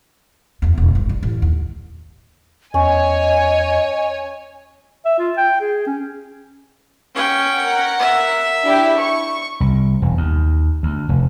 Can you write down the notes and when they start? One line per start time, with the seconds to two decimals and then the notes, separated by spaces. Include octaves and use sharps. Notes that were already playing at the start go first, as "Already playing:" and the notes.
0.62 F#1 E2
0.78 E1
0.95 G#1
1.09 G3
1.23 A1
1.42 D#2
2.74 E2 C#4 C#5 D#5 G#5
5.05 E5
5.19 F4
5.37 G5
5.61 G#4
5.87 C#4
7.15 C#4 G5
7.55 A#4 F#5
7.99 E5
8.64 D4 E4 G4
8.98 C#6
9.60 C2
10.02 E1
10.17 D#2
10.83 D2
11.09 F1